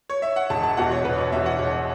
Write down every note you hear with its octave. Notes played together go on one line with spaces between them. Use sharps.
C#5
E5
F#5
E1 A5
A5
E2 B2 F#5
C#5
E1 B4
C#5
E2 B2 E5
F#5
E1 C#5